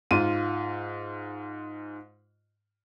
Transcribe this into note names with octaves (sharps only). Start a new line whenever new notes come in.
G#2 F4 D#7